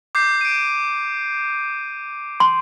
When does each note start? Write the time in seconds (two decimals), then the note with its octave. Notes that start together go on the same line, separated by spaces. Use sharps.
0.15 D6 G6 C7
0.41 D7 D#7
2.40 C6